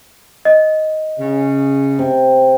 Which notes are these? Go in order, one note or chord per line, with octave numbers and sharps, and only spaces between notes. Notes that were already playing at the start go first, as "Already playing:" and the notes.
D#5
C#3
C3